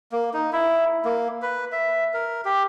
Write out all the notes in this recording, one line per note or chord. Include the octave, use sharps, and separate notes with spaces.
A#3
D#4
E4
A#3
B4
E5
A#4
G4